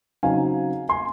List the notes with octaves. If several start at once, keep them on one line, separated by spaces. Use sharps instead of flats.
C#3 F#3 C4 D#4 F5 G#5
G#5 C6